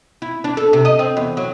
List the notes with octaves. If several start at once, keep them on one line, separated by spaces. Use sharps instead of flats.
E4
D4
A4
C3
D#5
C4
E2
F#3